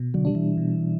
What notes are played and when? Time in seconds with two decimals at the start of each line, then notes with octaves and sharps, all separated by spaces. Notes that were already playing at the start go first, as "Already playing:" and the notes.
Already playing: B2
0.14 D3 F#3
0.25 G3 D4
0.35 E3
0.57 B2